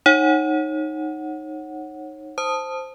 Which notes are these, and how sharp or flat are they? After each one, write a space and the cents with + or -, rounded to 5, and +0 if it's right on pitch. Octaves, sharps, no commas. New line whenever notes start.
D#4 -5 C#5 -25 F#5 +0
C5 +0 A5 +0 D#6 +0